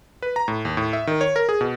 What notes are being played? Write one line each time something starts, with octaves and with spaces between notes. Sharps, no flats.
B4
A#5
A2
D#2
A2
E5
D#3
C#5
A#4
G#4
B2